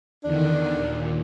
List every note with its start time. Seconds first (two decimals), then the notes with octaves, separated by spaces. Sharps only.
0.24 E2 D3 D#3 D4
0.75 D#2 A#2